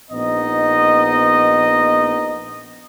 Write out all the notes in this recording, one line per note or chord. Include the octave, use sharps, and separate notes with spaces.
A#1 B3 D#4 D#5